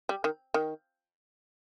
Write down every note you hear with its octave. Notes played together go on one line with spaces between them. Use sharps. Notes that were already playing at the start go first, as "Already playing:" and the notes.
G3
D#3
D#3